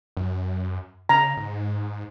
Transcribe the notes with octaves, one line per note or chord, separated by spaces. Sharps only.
F#2
C#3 A#5
G#2